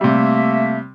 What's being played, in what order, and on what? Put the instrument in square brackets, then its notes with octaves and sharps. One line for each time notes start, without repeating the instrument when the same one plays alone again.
[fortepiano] C3 G3 [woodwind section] A3 A#3 E5